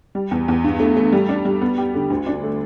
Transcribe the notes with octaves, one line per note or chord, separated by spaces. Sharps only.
G3
E2
E2
G2
A3
A3
G3
D4
G3
B3
G4
D3
D2
D4
A3